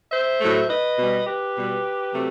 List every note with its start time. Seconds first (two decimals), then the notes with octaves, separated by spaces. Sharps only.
0.12 C5 E5
0.40 A2 F#3 A3
0.69 B4 D#5
0.97 B2 G3
1.26 G4 B4
1.55 B2 G3
2.13 C3 F#3 A3